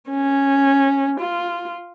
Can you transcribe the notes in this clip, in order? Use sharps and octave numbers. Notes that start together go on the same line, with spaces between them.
C#4
F4